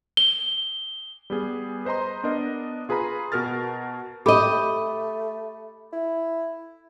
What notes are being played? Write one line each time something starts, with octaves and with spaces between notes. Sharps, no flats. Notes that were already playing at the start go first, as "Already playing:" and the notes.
G7
G3 B3 G#4
B4 C5 D#5 A#5 C6
B3 D4 A#4 D#5
F4 G#4 B4 A#5 B5
B2 F#4 A#4 F6 A6
A3 G4 A4 D#5 B5 D6
E4